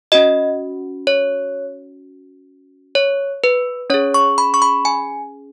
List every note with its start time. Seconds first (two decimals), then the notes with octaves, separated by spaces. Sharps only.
0.12 C#4 F#4 D#5
1.07 C#5
2.95 C#5
3.44 B4
3.90 C#4 C#5
3.94 G#4
4.14 C#6
4.38 B5
4.54 C#6
4.62 B5
4.85 G#5